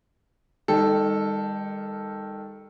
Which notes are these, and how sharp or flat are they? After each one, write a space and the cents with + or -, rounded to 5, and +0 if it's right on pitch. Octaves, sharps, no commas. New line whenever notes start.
D#3 +0 G3 +45 A4 +0